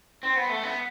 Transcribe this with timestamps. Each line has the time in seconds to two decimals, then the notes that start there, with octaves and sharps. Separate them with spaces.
0.23 C4
0.36 B3
0.50 A3
0.63 B3